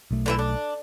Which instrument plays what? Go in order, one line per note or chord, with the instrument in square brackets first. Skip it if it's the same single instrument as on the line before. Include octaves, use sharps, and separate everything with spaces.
[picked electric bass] B1 A3
[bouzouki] D3 E3 E5
D4